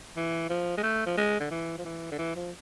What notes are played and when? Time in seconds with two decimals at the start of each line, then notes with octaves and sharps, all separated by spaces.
0.17 E3
0.49 F3
0.77 G#3
0.83 A3
1.06 F3
1.17 G#3
1.40 D3
1.51 E3
1.78 F3
1.85 E3
2.12 D3
2.18 E3
2.36 F3